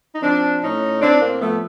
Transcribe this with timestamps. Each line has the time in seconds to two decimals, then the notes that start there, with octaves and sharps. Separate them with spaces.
0.13 D#4
0.22 F3 C4 D4
0.62 A2 C#4 D#4
1.01 A2 C4 D4
1.21 A#3 C4
1.40 F3 A3 B3